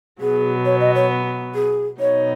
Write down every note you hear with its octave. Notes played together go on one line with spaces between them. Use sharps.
B2 F#3 B3 G#4
C#5
D#5
C#5
G#4
B2 F#3 B3 D#4 C#5